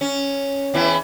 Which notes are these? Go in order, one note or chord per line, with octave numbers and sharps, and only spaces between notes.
C#4
E2 E3 E4